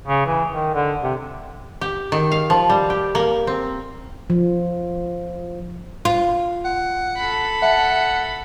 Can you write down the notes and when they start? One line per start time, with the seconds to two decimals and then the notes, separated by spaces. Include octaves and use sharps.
0.07 C#3
0.26 E3
0.53 D#3
0.75 D3
1.03 C3
1.81 G4
2.12 D#3
2.32 F5
2.50 F3
2.69 G3
2.90 G4
3.15 A#3
3.47 C4
4.30 F3
6.05 F4
6.65 F#5
7.18 A4 B5
7.62 E5 F#5 A5